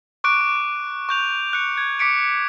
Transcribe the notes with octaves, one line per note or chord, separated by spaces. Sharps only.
C#6 D6 F#6 D7
C#6
C#6 G6 F7
F#6 C#7
G#6
D6 B6 C#7 D7